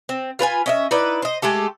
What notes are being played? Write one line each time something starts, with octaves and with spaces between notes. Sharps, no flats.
C4
F4 B4 C5 G#5
C#4 D#5 E5
D#4 E4 B4 D5
C5 D#5
G#3 A3 G4 A4